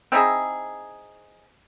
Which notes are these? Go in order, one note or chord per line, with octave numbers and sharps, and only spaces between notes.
C4 D#4 E4 G#4